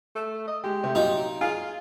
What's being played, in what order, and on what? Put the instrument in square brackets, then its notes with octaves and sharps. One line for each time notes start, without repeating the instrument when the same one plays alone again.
[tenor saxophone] A3
D#5
[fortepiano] G#3 [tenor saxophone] G4
[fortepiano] C3 A3
[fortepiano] C2 A#2 F#3 [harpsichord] D#4
[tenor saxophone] F4 [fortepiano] G#4 F5